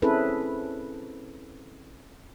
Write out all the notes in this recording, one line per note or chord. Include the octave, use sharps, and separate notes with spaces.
C4 C#4 E4 G#4 A4 B4